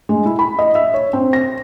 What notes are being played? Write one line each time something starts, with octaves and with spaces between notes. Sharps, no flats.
G#3
E4
B5
D#5
E5
C#5
C4
A#6